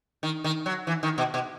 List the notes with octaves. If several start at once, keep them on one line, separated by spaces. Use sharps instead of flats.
D#3
D#3
F#3
E3
D#3
B2
B2